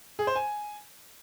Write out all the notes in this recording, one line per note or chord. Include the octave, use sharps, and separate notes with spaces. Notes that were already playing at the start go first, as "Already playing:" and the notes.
G#4
C5
G#5